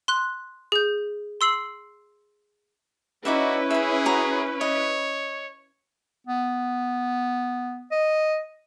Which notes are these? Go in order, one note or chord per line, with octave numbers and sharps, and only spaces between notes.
C6 F#6
G#4 G6
C6 E6 C7 F#7
C#4 D#4 E4 F#4 B4 D5 E5
G#4 E5 B5
F#4 A#5 D#6
C#5 D#5
B3
D#5